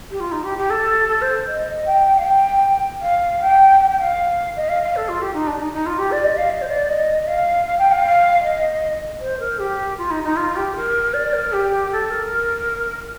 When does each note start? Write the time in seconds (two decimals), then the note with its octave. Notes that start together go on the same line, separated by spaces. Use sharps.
0.10 G4
0.20 F4
0.31 D#4
0.44 G4
0.57 G4
0.70 A4
1.08 A4
1.21 C5
1.47 D#5
1.86 G5
2.18 F5
2.24 G5
3.01 F5
3.41 G5
3.79 G5
3.90 G5
3.99 F5
4.56 D#5
4.69 F5
4.82 F5
4.96 A4
5.08 F4
5.21 G4
5.34 D#4
5.47 D4
5.60 D#4
5.73 D#4
5.86 F4
5.98 G4
6.11 D5
6.24 D#5
6.37 F5
6.50 D#5
6.61 C5
6.69 D5
6.89 D#5
7.27 F5
7.65 F5
7.78 G5
7.92 F5
8.05 F5
8.43 D#5
9.20 C5
9.39 A#4
9.59 G4
9.98 F4
10.10 D#4
10.23 D#4
10.36 F4
10.56 G4
10.76 A#4
11.13 D5
11.33 A#4
11.52 G4
11.92 A4
12.10 A#4